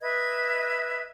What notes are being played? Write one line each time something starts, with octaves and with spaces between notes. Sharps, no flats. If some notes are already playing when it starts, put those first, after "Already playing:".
B4 D#5 E5 G#6